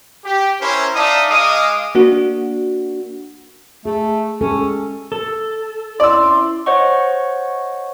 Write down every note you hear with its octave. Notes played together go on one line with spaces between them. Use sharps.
G4
C#4 E4 A#4 C5
D#4 D5 E5 F5 A5 D#6
G#3 D#5 F5 D6 D#6
A#3 D4 F#4
A3 G#4
G#3 C#4 G4 A4
A4
C4 C#4 E4 D5 C6 E6
C5 C#5 D#5 F#5 C#6